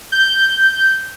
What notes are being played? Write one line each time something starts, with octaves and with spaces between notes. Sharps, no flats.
G6